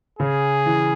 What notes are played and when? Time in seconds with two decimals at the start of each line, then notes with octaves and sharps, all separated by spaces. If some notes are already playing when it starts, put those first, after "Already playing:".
0.19 C#3 G#4
0.66 E3